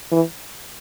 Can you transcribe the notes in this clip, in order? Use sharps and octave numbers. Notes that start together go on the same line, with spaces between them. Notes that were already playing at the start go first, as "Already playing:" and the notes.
E3